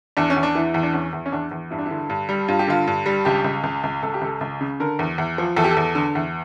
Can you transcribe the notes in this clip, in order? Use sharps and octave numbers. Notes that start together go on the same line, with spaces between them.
E2 D4
C#4
E2
D4
E3
E2
D4
E2 C#4
E2
C#4
E2 D4
E2
G2 E4
D4
D3 E4
G2
G3
G2 F4
G4
D3 F4
G2
G3
C#2 G4
C#2
C#2
C#2
C#2 A4
G4
C#2 A4
C#2
C#3
D3 A#4
E2
E2
F3
E2 A4
G4
A4
E2
D3
E2